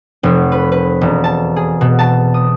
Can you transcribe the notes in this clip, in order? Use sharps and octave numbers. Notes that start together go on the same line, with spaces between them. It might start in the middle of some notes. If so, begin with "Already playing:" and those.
F1
B4
B4
E1
A5
G#4
B2
A5
D#6